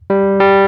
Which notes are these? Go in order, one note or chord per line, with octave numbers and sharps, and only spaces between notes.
G3
G3